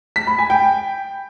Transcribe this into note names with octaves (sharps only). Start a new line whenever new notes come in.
B6
B5
G#5
G5